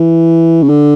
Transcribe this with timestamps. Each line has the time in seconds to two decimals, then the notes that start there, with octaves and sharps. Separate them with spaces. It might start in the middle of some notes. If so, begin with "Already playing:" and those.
Already playing: E3
0.63 C#3
0.69 D3